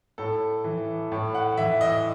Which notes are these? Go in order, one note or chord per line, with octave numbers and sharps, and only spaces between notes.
A2 A4
E3
A2
F#5
E3 E5
D#5